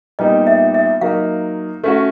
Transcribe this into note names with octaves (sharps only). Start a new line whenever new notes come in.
A#2 G3 B3 D#4 D#5
E5
E5
F#3 A#3 D#4 F5
A3 C#4 F#4